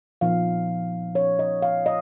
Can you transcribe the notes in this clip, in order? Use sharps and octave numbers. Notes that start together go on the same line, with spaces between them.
A#2 F3 B3 D#4 F5
C#5
D#5
F5
D#5